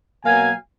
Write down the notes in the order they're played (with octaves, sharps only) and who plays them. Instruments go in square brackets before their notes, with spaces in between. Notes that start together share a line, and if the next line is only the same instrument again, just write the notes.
[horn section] B2 F#3 A#3 F5 G#5